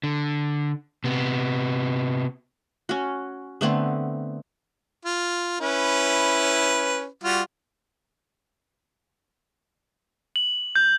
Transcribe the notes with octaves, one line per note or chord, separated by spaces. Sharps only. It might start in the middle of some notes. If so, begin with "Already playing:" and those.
D3
C3 B3
C#4 F#4
D3 A3 B3 C4
F4
C#4 E4 B4
G3 F4 F#4
F#7
G6